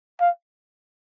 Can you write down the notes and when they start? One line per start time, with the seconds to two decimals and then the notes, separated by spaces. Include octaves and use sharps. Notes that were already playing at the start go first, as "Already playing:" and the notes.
0.20 F5